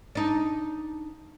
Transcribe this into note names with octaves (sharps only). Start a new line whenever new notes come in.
D4 D#4